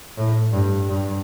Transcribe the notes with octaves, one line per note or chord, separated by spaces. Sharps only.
A2
G2
G2